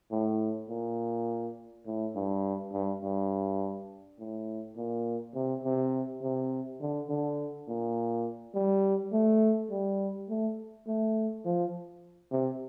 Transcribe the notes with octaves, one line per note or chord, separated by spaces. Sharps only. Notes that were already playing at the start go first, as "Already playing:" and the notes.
A2
A#2
A2
G2
G2
G2
A2
A#2
C3
C3
C3
D3
D3
A#2
G3
A3
G3
A3
A3
F3
C3